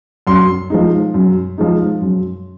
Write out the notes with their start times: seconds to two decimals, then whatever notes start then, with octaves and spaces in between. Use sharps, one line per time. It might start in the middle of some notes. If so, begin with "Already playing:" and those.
0.27 F#2 C6
0.70 F3 G#3 D#4
1.14 F#2
1.58 F3 G#3 D#4
2.02 F#2